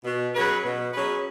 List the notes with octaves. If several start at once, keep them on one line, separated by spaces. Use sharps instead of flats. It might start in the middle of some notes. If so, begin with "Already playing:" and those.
B2
F#3 C#4 G#4 B4
B2
F#3 C#4 G#4 B4